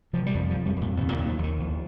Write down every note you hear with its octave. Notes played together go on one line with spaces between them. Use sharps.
C3 F3
G3
F2 F3
F3
F2
G2 G3
F2
A#2 A#3
D#2 C3 C4
A#2 A#3
D#2 D#3
F3
D#2
D#3
D#2 F3